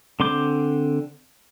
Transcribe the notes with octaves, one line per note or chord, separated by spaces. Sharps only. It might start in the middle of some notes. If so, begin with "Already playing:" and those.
D3 C4 C6 D6 G6